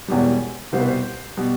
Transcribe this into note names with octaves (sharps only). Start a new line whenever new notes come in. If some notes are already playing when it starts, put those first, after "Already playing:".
E1 E2 B2 G3
C2 B2 G3 C5
B4
C5
B2 G3